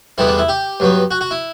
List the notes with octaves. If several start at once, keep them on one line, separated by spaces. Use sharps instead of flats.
E2 D3 G3 B3 E4
D4
E4
G4
G2 F#3 B3
F#4
F#4
E4